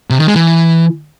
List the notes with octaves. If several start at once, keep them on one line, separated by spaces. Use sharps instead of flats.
C3
D#3
G#3
E3